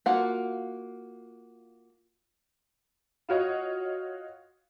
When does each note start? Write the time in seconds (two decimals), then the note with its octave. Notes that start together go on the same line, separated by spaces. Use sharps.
0.06 A#3 F4 F#4 F#5
3.29 F4 F#4 C#5 D#5